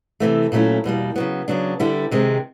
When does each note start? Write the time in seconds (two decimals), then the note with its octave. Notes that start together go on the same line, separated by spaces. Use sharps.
0.20 C3 E3 A3
0.52 A#2 F#3 A3 C#4 E4
0.84 E2 B2 G3 A#3
1.16 C#3 F#3 B3
1.48 C#3 F#3 B3 D4
1.80 D3 G3 B3 E4
2.11 C3 D#3 G#3 C4